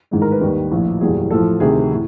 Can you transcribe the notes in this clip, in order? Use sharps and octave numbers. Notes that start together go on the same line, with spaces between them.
A1 G#2 D#3 G#3
A#4
B4
D#2 D#3 G3
A#1 A2 F3
F#1 E2 B2 G3 G#4
A1 A2 F3 A4
D2 C3 D#3 G#4
A2